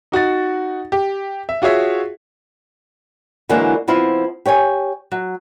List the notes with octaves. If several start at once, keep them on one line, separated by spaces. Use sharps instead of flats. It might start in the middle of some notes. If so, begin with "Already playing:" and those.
D#4 F#4 F#5 A6
G4
E5
F4 F#4 G#4 C#5 E5
D3 E3 F#3 G#3 A#3
F3 B3 C4 E4 F4
G4 C#5 G5 G#5
F#3